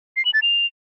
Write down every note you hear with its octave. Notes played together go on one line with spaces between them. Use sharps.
C7
F#7
A6
F7